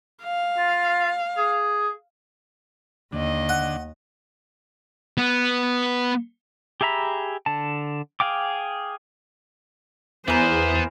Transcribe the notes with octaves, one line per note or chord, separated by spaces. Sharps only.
F5
F4
G#4
D#2 D3 D#5
F#5
B3
G4 G#4 E5 A#5 B5
D3 A5
G#4 F5 G5 D6
E2 E3 B3 A#4 C5